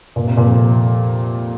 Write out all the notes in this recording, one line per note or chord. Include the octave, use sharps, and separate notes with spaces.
A#2
C3
A#2
F2